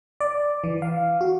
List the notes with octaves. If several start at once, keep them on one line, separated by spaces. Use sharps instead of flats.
D5
E3
F5
F#4